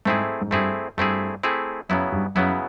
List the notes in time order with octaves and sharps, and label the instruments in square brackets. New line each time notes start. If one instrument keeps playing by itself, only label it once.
[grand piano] G#2 [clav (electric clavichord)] A3 C4 E4 G#4
[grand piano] G#2
[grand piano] G2 [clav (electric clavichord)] A3 C4 E4 G#4
[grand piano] G2 [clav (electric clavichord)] A3 C4 E4 G#4
[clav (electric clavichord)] A3 C4 E4 G#4
[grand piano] F#2 [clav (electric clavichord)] C#3 F#3 B3 E4
[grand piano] G2
[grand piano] F#2 [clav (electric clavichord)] C#3 F#3 B3 E4